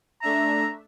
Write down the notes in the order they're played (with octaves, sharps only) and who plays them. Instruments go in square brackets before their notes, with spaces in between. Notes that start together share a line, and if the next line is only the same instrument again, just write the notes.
[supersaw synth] A3 D4 E5 [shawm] A#5